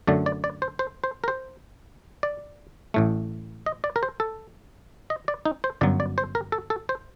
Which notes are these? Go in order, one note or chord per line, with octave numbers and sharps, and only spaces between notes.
F#2 D3 A3 D5
D5
D5
C5
C5
C5
A#4
C5
D5
A1 A2 A3
D#5
D5
A#4
C5
A4
D#5
D5
D#4
C5
G1 F#2 F#3 D5
D5
C5
A#4
A4
A4
C5